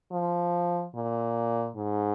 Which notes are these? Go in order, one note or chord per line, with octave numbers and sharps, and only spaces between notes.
F3
A#2
G#2